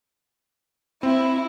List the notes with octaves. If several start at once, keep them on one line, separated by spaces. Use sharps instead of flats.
C4 E4